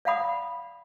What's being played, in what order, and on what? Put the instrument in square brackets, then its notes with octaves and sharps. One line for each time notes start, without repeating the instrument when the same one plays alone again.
[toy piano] D5 F5 F#5 B5 D#6